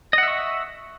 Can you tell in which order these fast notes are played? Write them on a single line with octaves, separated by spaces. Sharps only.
D#5 F#5 E5 C#6